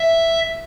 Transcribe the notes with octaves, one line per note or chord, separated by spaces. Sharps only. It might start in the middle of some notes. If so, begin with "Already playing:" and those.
Already playing: E5